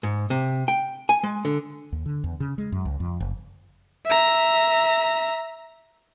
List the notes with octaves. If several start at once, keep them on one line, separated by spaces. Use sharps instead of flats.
G#2
C3
G5
G#5
G#3
D3
D#2
D3
E2
C#3
G#3
F#2
C#2
F2
F#1
E5 A#5